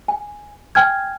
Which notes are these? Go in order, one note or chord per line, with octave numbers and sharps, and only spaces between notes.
G#5
G5 G#5 F6 G#6